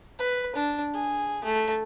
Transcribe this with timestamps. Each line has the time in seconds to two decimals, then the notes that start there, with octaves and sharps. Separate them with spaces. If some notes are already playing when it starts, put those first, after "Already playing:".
0.19 B4
0.56 D4
0.94 G#4
1.44 A3